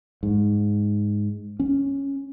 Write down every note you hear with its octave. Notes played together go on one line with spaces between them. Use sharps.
G#2
C#4